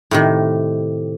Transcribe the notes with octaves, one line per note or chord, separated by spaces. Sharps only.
A2 C3 D#3